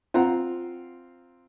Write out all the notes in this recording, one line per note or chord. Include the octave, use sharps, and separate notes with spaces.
C4 F4 F#5 A#5